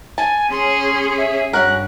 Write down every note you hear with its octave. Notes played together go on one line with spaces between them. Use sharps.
G#5 A5
C#4 G#4 C#5 C6
E5
G2 C#4 F#4 A#4 F#6